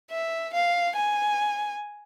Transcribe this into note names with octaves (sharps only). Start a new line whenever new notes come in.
E5
F5
G#5